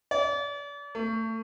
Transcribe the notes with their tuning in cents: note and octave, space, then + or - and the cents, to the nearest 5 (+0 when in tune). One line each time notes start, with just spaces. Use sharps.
D5 -40
A3 +30